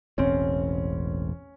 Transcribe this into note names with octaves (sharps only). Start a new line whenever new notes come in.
E1 A1 C4 C#4